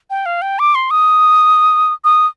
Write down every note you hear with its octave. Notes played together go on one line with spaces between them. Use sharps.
G5
F5
G5
D6
C6
D#6
D#6